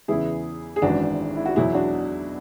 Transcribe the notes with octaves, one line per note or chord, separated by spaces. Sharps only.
E2 C#3 E3 E4 G#4
G#4
G#1 F#2 E3 D4 F#4
E4
F#4
E2 B2 F#3 E4 G#4
D4 F#4